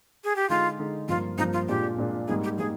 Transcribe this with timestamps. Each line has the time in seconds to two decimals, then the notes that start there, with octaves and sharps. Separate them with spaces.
0.24 G#4
0.36 G4
0.49 D3 G#3 D#4 F4
0.79 D3 G#3 D#4
1.09 G2 F3 A#3 F4
1.38 G2 F3 A#3 D#4
1.53 F4
1.68 A#2 G#3 D4 F4 G4
1.98 A#2 G#3 D4 F4
2.28 G#2 G3 A#3 D#4 G#4
2.44 G4
2.58 G3 A#3 D#4 G#4